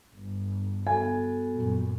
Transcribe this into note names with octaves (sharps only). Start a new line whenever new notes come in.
G1
B3 F#4 A4 G#5
F#2 A#2